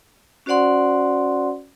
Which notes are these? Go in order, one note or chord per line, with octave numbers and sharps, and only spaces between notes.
C#4 F#4 C5 D5 F#5 C6